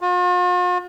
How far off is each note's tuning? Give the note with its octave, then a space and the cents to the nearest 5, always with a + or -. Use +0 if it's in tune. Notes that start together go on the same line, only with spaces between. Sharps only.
F4 +45